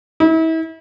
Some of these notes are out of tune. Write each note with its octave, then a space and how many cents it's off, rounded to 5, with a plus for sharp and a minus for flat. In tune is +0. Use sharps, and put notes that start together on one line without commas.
E4 -35